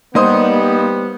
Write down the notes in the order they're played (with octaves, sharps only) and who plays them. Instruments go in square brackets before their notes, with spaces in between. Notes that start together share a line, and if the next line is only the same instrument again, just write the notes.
[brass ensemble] G3 B3 [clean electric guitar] A#3 [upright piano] D#4 C5 D#6